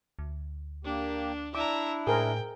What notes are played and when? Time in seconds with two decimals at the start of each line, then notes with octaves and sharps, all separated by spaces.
0.19 D2
0.85 A#3 D4 G4
1.55 D4 E4 E5 A#5 D6
2.07 A2 G#4 A#4 C5 G5